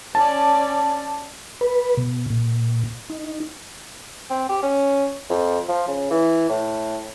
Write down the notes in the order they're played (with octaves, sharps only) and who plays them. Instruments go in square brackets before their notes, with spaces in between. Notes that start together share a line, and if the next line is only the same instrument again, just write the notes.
[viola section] C#4 D5 [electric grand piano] A5
[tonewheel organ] B4
B2
A#2
D#4
[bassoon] C4
G4
C#4
F2
F3
C#3
E3
A2